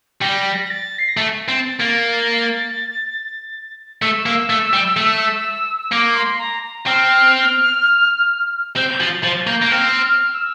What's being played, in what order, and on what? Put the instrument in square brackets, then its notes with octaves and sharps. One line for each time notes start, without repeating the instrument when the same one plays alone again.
[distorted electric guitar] G3 [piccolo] A#6
[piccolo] A#6
A6
C7
A#6
[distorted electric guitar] A3 [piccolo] A6
[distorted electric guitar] C4
A#3
[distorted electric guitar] A3 [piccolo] E6
[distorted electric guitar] A#3
A3
G3
A3
[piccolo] E6
[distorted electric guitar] A#3 [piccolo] D6
[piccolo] C6
A#5
A#5
[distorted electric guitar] C4 [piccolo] F6
[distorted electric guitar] C4 [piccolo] G6
[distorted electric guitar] F3 [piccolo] A6
[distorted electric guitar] F3 [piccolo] A6
[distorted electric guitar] A#3 [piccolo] G6
[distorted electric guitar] A#3
[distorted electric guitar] C4 [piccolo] F6
[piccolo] F6
E6